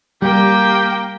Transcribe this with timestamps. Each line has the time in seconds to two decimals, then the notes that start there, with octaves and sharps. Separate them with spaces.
0.22 G3 A#3 G4 G5